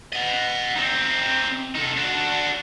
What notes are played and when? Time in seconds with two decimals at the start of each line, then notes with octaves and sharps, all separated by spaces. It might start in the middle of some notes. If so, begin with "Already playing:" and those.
0.13 D#5 F#5
0.76 C4 D#4
1.75 D#4 A4
1.97 D4 F#4